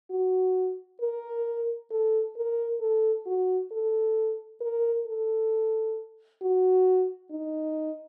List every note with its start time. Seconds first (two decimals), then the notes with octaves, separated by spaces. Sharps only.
0.10 F#4
1.01 A#4
1.91 A4
2.36 A#4
2.80 A4
3.26 F#4
3.72 A4
4.61 A#4
5.07 A4
6.42 F#4
7.31 D#4